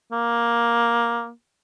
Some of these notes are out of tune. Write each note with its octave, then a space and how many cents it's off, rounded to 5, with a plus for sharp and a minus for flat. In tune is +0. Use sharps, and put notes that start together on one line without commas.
A#3 +10